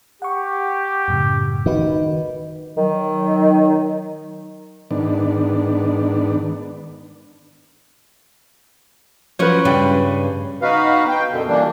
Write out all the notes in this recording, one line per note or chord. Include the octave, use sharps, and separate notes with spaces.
G4 F#5 C#6
F#2 A2 C#3
D#3 F#4 B4
D#3 F#3
G#2 D#3 B3 D4
F3 F#3 C#4 B4 C#5
G2 C#3 G3
B3 D#4 F#4 B4 F5
G5
F#2 B2 D3
E3 G3 A#3 D4